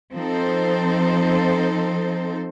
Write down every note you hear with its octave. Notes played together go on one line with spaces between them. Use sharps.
F3 C4 D#4 A4 C5